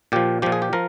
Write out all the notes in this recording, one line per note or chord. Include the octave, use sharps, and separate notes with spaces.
A#2 F3 G4
A#2 F3 G4
G#4
G4
F3 A#4